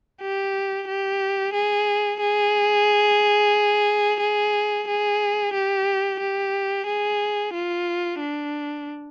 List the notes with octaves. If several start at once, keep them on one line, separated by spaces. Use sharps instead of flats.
G4
G4
G#4
G#4
G#4
G#4
G4
G4
G#4
F4
D4